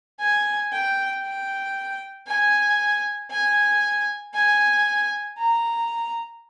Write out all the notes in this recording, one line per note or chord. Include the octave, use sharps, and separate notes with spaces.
G#5
G5
G5
G#5
G#5
G#5
A#5